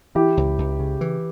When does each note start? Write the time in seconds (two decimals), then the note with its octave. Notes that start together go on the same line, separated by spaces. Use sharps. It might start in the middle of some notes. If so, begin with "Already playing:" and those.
0.15 E3 E4 G4
0.37 C#2
0.58 C#2
0.80 C#3
1.01 E3